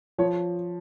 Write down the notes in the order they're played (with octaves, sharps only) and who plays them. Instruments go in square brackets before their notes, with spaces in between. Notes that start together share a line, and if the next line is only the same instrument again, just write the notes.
[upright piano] F3 C#5